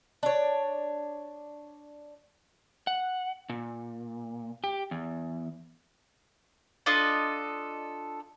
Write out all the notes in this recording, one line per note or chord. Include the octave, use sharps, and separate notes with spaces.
D4 C#5
F#5
A#2
G4
E2
D4 F4 A4 D#5